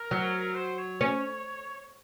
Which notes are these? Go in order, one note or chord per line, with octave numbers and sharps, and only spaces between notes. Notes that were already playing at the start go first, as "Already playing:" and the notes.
Already playing: A#4
F#3
C5
C#5
C#4